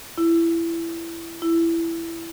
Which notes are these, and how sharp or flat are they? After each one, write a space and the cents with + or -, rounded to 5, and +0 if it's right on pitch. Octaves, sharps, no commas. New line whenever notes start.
E4 +20
E4 +15